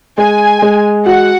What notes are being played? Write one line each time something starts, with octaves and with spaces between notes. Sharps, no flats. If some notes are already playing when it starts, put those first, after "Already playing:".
G#3 G#5
G#3
F#4 F#5